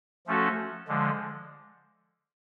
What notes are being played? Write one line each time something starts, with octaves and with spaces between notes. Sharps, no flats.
F3 A3 C#4 F#4 A4
D3 F3 G#3